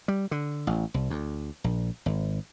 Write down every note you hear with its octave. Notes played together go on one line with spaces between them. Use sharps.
G3
D3
A1
C2
D2
A#1
G#1